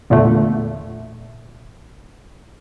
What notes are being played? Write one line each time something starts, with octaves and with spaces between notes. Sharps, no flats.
E2 A#2 D3 A3